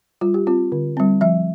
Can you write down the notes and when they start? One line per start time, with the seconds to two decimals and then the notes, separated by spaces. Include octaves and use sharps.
0.21 G3 F4
0.34 G4
0.47 C4 F4
0.72 D3
0.97 G3 C4
1.21 F3 E5